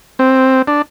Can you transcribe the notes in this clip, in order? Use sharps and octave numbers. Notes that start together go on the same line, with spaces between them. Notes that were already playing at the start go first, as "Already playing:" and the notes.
C4
D4